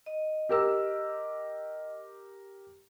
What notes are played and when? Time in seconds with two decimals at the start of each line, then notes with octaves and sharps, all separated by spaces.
0.06 D#5
0.49 G4 A#4 E6